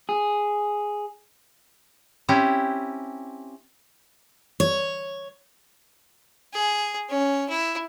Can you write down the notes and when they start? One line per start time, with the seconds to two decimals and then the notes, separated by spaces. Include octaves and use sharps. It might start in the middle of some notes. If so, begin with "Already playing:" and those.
0.09 G#4
2.28 C4 C#4 E4 G4
4.60 C#5
6.53 G#4
7.09 C#4
7.50 E4